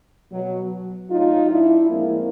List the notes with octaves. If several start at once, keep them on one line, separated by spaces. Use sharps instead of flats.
B2 F#3
A2 F#3 D#4 F4
D4 E4
A2 F3 G#3 A#3 C4